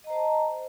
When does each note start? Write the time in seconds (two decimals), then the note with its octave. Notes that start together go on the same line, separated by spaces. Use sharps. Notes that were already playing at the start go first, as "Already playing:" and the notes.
0.04 D#5
0.07 A#5
0.10 C5
0.13 A5